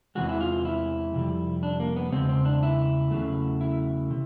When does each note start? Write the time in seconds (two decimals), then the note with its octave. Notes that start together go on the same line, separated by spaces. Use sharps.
0.15 E2 C3 E3 G#3 F#4
0.29 E4
0.41 F4
0.65 E4
1.14 F2 C3 G3
1.63 D4
1.80 A#3
1.97 B3
2.12 E2 C#3 G#3 C4
2.29 C4
2.45 D4
2.63 E4
3.11 E2 C#3 F#3 A3
3.61 E4
4.10 C3